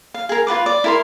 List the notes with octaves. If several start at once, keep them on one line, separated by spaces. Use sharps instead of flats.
F5
G#4 A#4
F4 F#4 B4 D6
D5
E4 A#4 C6